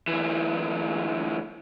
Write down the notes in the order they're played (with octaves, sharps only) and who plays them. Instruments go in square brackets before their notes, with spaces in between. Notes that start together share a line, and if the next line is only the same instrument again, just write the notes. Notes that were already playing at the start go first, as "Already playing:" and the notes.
[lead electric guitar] D2 E3